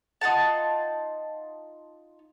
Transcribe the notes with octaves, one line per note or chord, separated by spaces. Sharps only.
D#4 F4 F#5 A5